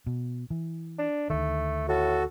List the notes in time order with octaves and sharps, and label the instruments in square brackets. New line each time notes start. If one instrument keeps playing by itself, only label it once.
[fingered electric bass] B2
E3
[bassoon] D4
[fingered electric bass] D2 D#3 [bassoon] A3
[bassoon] A2 [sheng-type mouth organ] F#4 A4